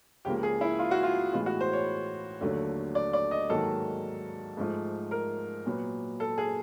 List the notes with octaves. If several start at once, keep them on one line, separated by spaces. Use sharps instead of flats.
C#2 C#3 F3 A#3 G4
G#4
E4
F4
F#4
F4
A2 E3 G#3 B3 F4
F#4
C5
C#5
D#2 D3 F#3 A3
D5
D5
D#5
G#2 D#3 F#3 A#3 A4
G#2 F3 A3
A#4
A#2 F#3 B3
A4
G#4